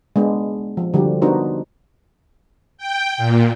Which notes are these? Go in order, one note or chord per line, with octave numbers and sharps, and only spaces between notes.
G#3 B3 D4
F3
D3 F3 G3 F#4 G4
B3 D4 D#4 F#4 A#4 C5
G5
A#2